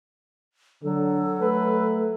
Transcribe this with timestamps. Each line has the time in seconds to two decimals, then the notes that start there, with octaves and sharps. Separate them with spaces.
0.83 D3 F#3 A4
1.41 A3 B4